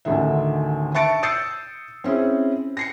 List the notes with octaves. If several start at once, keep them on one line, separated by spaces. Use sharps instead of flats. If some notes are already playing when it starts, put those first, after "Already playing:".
A1 D2 D3 D#3 E5
E5 A5 C#6 A6 C#7 D7
D#6 E6 G6 A6 C7 C#7
C4 C#4 E4 G#4
A#6 C7 C#7